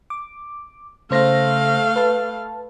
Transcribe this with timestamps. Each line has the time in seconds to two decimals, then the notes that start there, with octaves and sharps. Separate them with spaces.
0.10 D6
1.11 C#3 A3 C5 F5 A#6
1.96 B4 A5